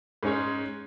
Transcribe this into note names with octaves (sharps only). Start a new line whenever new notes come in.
G#2 G#3 C#4 G#4 C#5